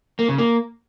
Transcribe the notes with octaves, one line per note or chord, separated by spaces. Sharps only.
A#3
C#3
A#3